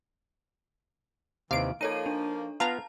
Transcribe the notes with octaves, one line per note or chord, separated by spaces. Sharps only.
D#2 C3 E3 F5 D7
F3 A#3 D#4 A4 C#5 D#7
D4
B3 F4 F5 A5 A#5 F6